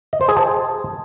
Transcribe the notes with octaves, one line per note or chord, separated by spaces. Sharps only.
D#5
C5
G#4
A5